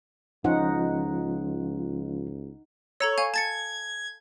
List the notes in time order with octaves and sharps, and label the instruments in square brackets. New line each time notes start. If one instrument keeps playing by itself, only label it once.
[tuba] C#2 [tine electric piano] F3 C#4 F4 [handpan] D#4 F#5
[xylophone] A4 A#5 E6 [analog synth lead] C#5
[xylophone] F5 G#5 G#6
[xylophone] A5 A6 C#7 [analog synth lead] G#6